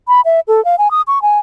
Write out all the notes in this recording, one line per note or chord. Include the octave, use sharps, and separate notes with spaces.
B5
E5
A4
F5
G#5
D#6
C#6
G#5